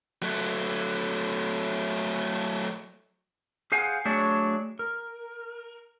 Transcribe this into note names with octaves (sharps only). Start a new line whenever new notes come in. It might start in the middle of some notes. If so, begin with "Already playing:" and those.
F#3 A3
G#4 C5 F5 F#5 G#5
F#3 A3 D4 G#4 C#5 D5
A#4